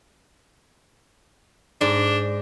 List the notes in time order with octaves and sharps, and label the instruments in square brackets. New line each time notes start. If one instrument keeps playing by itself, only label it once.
[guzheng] G#2 [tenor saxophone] D4